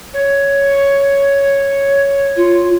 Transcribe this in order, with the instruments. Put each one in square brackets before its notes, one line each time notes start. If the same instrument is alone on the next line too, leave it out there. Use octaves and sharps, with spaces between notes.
[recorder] C#5
[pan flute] F4